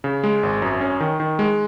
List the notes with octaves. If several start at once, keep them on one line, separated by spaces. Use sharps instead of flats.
C#3
G#3
G#1
F#2
C#4
D#3
D#3
G#3